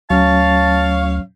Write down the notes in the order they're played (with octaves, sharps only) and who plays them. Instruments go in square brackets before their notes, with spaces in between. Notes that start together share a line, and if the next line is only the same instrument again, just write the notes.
[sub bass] D2 [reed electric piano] F#3 C#4 [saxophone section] C#5 F5 [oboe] A5